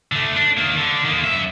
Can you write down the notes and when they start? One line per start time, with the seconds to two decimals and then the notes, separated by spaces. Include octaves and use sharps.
0.12 D3 A3
0.36 D4
0.57 D#3 A#3
0.77 D3
1.05 D#3 A#3
1.24 F#2 E5